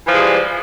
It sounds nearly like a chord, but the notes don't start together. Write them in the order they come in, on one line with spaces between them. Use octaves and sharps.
E3 F3 G#3 G3